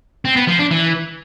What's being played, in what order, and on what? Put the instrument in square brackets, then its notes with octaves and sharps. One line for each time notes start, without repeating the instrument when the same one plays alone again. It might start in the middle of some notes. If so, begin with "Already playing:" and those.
[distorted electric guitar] C4
B3
F3
D4
E3